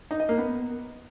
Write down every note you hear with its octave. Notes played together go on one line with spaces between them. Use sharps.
D#4
D#5
A#3
B3